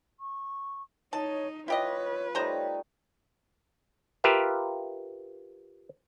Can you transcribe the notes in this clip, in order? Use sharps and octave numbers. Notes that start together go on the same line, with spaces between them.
C#6
D#4 C#5 D#5 A5
E4 F4 G4 B4 C#5 D#5
G3 A3 D#4 C5 C#5 A#5
F4 G4 A#4 B4 E5 F5